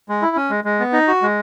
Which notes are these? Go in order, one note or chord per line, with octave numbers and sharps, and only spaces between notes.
G#3
E4
C#4
G#3
G#3
B3
D#4
F#4
G#3